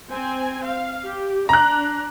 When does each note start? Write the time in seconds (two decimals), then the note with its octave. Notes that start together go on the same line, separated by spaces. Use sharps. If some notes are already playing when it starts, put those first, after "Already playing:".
0.11 C4 G#5
0.65 F5
1.03 G4
1.49 D4 A#5 F#6